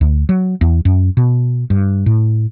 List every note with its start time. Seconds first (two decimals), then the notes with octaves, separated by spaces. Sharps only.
0.01 D2
0.29 F#3
0.61 E2
0.85 F#2
1.17 B2
1.70 G2
2.06 A2